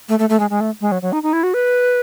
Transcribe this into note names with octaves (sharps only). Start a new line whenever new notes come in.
A3
A3
A3
G#3
G#3
A3
G#3
F#3
F#3
D#4
D#4
E4
F#4
B4